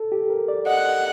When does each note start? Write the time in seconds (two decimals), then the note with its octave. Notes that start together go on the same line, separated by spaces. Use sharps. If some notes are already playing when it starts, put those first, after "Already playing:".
Already playing: A4
0.12 G4
0.30 A#4
0.48 D5
0.67 D#5 F#5